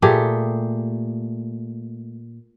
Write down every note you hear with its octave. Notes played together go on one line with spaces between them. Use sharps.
A#2 A3 G4 G#4